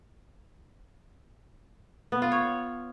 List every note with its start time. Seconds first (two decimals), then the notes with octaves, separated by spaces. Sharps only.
2.12 B3
2.22 F4
2.32 C#5